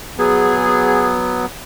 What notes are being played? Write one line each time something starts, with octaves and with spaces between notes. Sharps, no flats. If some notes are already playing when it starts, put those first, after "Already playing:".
F#3 B3 G#4